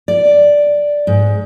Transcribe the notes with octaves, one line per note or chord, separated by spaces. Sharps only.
D5
G#2